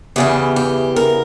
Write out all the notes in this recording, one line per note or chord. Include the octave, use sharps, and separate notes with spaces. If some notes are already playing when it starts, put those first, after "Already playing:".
E2 C#3 E3 G4
G4
A#4